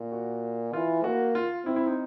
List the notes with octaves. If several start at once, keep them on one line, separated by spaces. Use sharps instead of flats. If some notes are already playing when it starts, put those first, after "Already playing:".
Already playing: A#2
F#4
E3 F4
A#3 F#4
F4
C4 E4
E4
D#4